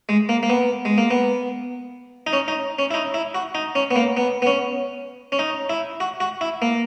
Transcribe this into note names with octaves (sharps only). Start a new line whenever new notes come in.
G#3
A#3
A#3
B3
G#3
A#3
B3
D#4
C#4
D#4
C#4
E4
D#4
E4
F#4
D#4
C#4
B3
A#3
B3
B3
C#4
C#4
D#4
E4
F#4
F#4
E4
A#3